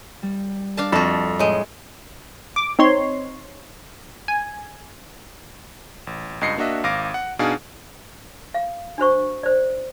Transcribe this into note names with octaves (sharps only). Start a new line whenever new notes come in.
G3
D4 A#4 F5 A5
F2 F#4 A4 E5
A2 G#3 C#5
D6
C4 D#4 C#5 C6
G#5
A1
C#2 G2 D#5 C7 C#7
A#3 D4 F#4 D#5 E5
G#1 F5 D6 A#6 D7
F#5
B2 D4 D#4 G#4 F5
F5
D4 F#4 C5 C#6
C5 D5